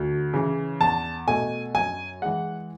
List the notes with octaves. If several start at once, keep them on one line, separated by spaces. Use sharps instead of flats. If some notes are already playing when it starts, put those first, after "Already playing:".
Already playing: D2
C#3 E3
E2 A5
B2 A3 G#5
F#2 G#5
E3 G#3 F#5